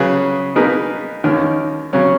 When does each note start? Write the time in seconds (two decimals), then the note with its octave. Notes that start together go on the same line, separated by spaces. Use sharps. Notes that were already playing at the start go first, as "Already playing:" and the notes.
Already playing: C#3 F#3 C#4 G#4 B4
0.55 B2 A#3 D#4 G#4 B4
1.24 D#2 D#3 A#3 C#4
1.93 C#3 F#3 C#4